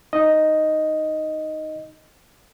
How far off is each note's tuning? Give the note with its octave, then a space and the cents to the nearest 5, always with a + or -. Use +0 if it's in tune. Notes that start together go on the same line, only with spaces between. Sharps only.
D#4 +0 D#5 +0